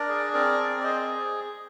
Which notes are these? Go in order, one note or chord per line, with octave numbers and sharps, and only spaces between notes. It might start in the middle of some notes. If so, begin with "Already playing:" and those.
Already playing: D4 A#4 D5
G#4
C4 A#4 D5
C4
D5
G#4 C5 D#5